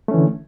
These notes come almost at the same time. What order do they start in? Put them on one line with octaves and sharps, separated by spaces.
A3 C#4 E3 D3